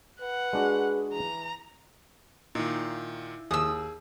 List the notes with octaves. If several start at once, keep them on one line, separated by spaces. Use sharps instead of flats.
B4 F#5
G#3 D4 F#4 G#4
E3 A#5
A#2 D#3 D#4 E4
D#2 G#4 D#6 E6